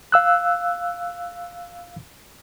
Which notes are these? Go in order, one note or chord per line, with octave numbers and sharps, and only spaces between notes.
F5 E6 F#6